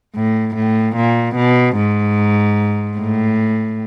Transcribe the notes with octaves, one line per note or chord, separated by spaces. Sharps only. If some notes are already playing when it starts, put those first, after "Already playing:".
A2
A2
A#2
B2
G#2
A2